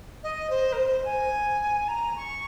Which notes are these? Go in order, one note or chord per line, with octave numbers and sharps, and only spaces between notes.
D#5
C5
A#4
C5
G#5
A#5
C#6